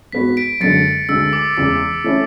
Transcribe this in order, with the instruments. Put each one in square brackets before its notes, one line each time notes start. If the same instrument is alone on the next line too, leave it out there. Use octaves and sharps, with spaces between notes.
[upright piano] G#2 G#3 B3 F#4 [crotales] B6
[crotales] B6 D7
[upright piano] F#2 D3 G#3 [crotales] A6 C#7
[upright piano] D2 D3 G#3 [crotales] E6
[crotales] D6
[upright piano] E2 C#3 E3 G#3 [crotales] D6
[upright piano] E3 A3 C#4 E4